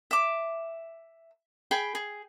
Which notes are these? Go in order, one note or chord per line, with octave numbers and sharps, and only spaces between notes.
E5 D6
G#4 G5 B5
G#4